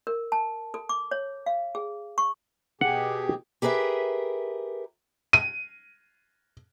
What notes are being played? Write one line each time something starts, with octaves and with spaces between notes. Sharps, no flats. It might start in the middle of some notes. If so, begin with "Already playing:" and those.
A#4
A5
A4
D6
C#5
F5
G#4
C#6
B2 G4 G#4 F#5
G4 G#4 A#4 B4 E5
D#7